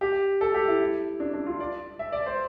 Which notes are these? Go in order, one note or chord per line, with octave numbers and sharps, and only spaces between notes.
G4
A4
G4
E4
D4
D4
F4
D5
E5
D5
C5